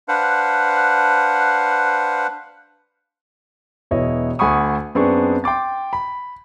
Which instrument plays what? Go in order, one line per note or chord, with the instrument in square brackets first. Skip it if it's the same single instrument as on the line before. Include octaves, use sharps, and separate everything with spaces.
[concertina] D4 B4 C5 F5 F#5
[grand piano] E1 B2 E4 C#5 D#5
D2 F#5 G#5 B5 C#6 D#6
F#2 B3 C4 D4 G#4 C#6
G5 C6 D6 A6
B5